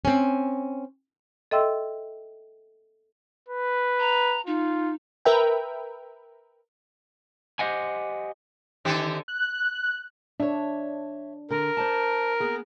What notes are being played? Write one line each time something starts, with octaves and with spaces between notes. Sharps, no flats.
C4 C#4
A4 D#5 E5 G5 C6 E6
B4
A#5
D#4 F4
A#4 B4 E5 G5
G4 C5 D#5 F#5 G#5
D3 D#3 C4 G4 A4 G#5
F#6
D4 C#5 E5
D3 A#4
C5 D5 A5
A#3 B3 G#4